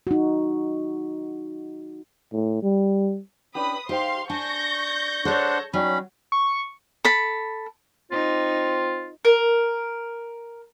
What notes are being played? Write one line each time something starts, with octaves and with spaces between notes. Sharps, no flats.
D#4 F#4
A2
G3
C#4 D4 G4 B4 B5 D#6
D#4 G4 C5 F5 G5 C6
D4 G#5 A5 C#6 G6 A#6
D4 A4 C5 C#5 F#5
F#3 C#4 D#4 D5 G5 B5
C#6
A4 B5
C4 D#4 F4
A#4